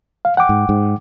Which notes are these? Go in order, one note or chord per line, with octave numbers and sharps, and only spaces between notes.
F5
F#5 G5 D6
G#2
G#2